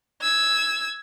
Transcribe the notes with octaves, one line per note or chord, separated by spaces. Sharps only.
E6 G#6